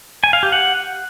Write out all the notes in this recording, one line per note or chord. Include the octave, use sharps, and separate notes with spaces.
G#5
F5
G4
F#5